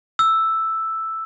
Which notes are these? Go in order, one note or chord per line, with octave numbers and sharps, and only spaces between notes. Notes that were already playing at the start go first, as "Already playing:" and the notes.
E6